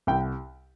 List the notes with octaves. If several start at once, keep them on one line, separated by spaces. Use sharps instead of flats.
C2 G5